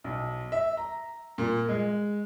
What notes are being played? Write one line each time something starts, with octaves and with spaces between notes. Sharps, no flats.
B1
E5
A#5
A#2
G#3